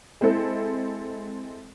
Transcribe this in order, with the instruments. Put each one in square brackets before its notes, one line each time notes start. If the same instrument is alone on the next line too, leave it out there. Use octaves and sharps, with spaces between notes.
[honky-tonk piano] G#3 C4 E4 A4